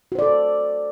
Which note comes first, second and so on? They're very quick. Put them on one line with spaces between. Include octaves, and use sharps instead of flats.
F#4 C5 D5 A4